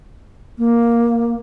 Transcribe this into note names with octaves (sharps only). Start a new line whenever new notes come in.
A#3